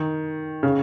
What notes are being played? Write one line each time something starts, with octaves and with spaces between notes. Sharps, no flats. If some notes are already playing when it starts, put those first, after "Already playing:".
Already playing: D#3
C#3